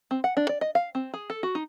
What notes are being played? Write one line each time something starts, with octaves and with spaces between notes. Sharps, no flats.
C4
F#5
D4
D5
D#5
F5
C4
G#4
A4
F#4
D#4